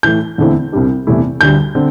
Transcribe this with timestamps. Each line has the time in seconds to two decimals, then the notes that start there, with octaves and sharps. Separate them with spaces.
0.03 A2 E3 A3 G6
0.38 E2 D3 A3 C4 E4
0.72 C2 C3 G3 D4
1.07 E2 C3 A3 E4
1.41 D2 D3 G3 G6
1.75 D3 C4